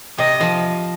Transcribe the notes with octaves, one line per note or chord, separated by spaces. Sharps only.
C3 D#5
F3